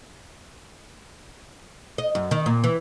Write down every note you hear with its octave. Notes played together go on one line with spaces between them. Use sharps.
D#5
F#2
D#3
A#2
E3